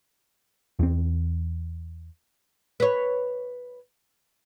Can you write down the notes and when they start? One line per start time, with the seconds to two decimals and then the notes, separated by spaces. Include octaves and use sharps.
0.79 E2 C4
2.80 B4 C#5